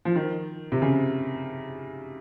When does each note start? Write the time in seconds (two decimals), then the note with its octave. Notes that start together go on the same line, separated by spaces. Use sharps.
0.05 F3
0.16 D#3
0.72 C3
0.82 C#3